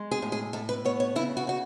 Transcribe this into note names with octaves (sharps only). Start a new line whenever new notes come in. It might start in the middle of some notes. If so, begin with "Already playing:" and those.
Already playing: G#3
G#4
A2
G#4
A2 A4
B4
B3 C#5
C#5
C#3 E4
F#4
C#3 F#4